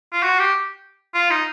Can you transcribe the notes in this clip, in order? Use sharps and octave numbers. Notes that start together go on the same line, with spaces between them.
F4
F#4
G4
F4
D#4